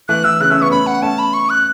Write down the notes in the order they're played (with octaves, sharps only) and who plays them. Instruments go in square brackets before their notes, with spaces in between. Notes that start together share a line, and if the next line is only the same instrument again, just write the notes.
[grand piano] E3 A3 [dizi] F#6
[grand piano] E3 [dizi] E6
[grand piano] C#3 [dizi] F#6
[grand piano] A3 C#4 [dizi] E6
[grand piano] B3 E4 [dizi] C#6
[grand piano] A3 C#4 [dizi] B5
[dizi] F#5
[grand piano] A3 C#4 [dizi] A5
[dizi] B5
C#6
F#6